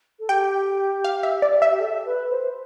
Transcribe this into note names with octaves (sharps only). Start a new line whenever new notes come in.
A4
G4 G5
F5
E5
D5
E5
G4
A4
B4
C5